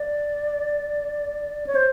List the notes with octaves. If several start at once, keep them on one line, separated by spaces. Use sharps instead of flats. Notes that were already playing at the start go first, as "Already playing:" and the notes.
Already playing: D5
C#5
C5